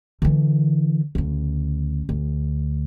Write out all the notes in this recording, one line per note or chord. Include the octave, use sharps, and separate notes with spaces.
D3 E3
D2 C#3
D2